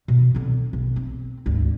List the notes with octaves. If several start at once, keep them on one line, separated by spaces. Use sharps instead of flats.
B2
D3 C4
B1
C4
G#1 D2